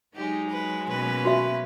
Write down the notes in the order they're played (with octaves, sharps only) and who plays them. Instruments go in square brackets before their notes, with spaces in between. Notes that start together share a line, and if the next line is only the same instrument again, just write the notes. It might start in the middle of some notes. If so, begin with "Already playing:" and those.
[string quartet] F#3 G#3 [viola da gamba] D#4 [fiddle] G4
[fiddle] B4
[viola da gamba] B2 A#3 C#4 [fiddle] B4
[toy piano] F#4 E5